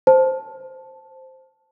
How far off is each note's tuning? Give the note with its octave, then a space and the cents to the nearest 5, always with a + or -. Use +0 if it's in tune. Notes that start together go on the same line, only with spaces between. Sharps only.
C5 +0 A5 +0